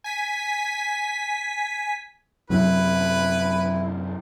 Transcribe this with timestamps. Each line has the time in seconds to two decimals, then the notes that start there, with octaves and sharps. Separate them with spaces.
0.04 G#5 B6
2.50 F#2 C3 E3 F#3 E4 B4